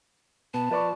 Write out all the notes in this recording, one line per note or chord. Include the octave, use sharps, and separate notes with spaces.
B2 B3 A5
F3 B4 D5 C#6